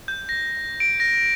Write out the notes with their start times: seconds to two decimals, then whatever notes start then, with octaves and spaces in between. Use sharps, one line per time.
0.08 G6
0.29 A#6
0.80 D7
1.00 A#6